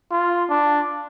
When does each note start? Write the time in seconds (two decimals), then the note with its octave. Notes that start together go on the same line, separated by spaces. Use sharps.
0.11 F4
0.49 D4